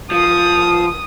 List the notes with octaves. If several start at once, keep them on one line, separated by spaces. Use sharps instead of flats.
F3 D#6